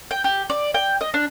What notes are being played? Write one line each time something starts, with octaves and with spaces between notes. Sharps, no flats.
G5
G4
D5
G5
D#5
D4